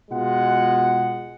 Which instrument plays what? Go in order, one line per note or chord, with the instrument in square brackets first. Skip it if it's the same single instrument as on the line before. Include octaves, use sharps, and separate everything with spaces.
[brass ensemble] B2 G#3 F4 F#5